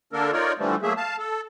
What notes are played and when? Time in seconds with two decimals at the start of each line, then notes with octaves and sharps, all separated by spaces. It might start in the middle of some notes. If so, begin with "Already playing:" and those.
0.13 D3 A#3 D4 A4 A#4
0.32 D#4 F4 A#4 C#5 D5
0.59 D3 E3 F3 G3 A3
0.82 F#3 A3 A#3 G#4 E5
0.97 F5 A5
1.19 A4